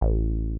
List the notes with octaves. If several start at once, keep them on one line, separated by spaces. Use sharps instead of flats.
A1